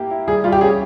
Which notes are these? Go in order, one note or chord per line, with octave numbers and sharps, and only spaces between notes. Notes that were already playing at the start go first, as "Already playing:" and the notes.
Already playing: A#3 E4 G4
E4
G3 G#4
G3 F4
G4
C#4 G#4